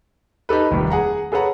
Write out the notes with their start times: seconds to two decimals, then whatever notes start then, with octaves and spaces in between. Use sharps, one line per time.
0.49 D#4 G4 A4 B4
0.71 F1 D#2 G3 B4
0.90 G#4 F#5 A#5
1.32 G#4 A4 B4 C#5 F#5 A#5